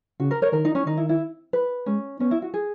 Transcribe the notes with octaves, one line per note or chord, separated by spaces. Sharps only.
C#3 F#4
A#4
A#4 C#5
D#3 A#4
D#4
C#4
D#3 D#4
E4
E4
B4
G#3 C#4
B3 C#4
E4
F#4
G#4